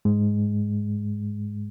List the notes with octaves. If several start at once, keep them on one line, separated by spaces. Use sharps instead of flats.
G#2 G#3